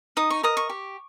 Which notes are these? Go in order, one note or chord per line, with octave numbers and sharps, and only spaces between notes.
D#4 D#6
C#6
A#4 D#5 D#6
C#6
G4